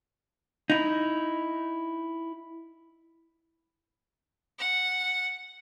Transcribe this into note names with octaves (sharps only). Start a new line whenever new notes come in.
D#4 E4
F#5